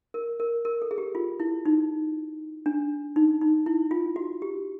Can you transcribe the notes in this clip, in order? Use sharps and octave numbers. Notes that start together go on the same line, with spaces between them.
A#4
A#4
A#4
A4
G#4
G4
F4
E4
D#4
D4
D#4
D#4
E4
F4
F#4
G4